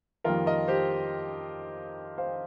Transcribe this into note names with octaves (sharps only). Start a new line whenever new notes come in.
F2 D#3 G3 A#3 F4 A#4
A#4 D#5
G4 C5
C5 F5